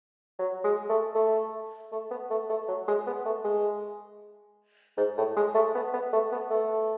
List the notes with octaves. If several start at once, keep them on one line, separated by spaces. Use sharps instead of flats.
F#3
G#3
A3
A3
A3
B3
A3
A3
F#3
G#3
B3
A3
G#3
G#2
A2
G#3
A3
B3
B3
A3
B3
A3